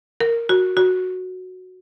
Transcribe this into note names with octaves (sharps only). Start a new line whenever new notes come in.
A#4
F#4
F#4